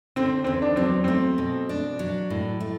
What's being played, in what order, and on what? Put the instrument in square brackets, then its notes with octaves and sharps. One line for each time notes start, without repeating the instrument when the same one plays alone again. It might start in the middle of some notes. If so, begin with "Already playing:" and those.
[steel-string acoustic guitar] D3 [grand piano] C4
[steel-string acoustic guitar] E2 [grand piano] C4
[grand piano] D4
[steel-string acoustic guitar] F#3 [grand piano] C4
[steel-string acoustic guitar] A3 [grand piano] C4
[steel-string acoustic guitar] B2
D4
F#3
A2
A3